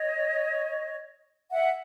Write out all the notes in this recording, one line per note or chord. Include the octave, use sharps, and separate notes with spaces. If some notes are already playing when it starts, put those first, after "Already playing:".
Already playing: C#5 D#5
E5 F#5